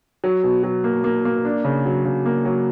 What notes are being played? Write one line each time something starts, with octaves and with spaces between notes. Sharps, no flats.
F#3
B2
F#3
A#3
A#3
A#3
D4
C#3
F#3
C#3
A#3
F#3